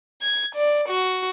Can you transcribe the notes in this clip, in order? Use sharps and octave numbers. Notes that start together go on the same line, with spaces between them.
G#6
D5
F#4